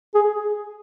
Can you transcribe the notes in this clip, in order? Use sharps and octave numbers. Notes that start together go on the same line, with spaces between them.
G#4